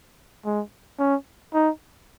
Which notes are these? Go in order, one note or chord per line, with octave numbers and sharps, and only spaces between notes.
G#3
C#4
D#4